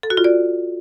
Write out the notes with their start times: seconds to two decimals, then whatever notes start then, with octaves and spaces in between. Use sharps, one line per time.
0.03 A4
0.10 F#4
0.17 F4
0.24 D5